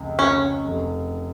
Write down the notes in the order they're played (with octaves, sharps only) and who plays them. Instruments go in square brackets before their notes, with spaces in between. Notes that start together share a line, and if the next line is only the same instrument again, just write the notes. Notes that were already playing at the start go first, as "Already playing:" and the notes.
Already playing: [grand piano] F1 C#2
[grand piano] C#3 [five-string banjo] C#4
[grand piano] F1